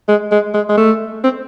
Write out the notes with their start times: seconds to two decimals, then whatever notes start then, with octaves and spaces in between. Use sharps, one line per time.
0.08 G#3
0.32 G#3
0.54 G#3
0.69 G#3
0.78 A3
1.24 C4